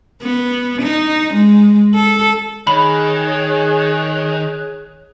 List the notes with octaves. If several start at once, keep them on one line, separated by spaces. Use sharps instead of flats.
B3
D#4
G#3
A4
D#3 G#4 C#5 B5 F#6